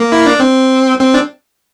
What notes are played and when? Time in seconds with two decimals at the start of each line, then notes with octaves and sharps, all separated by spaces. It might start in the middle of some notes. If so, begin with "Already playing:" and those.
Already playing: A#3
0.12 E4
0.26 D4
0.40 C4
1.00 C4
1.14 D4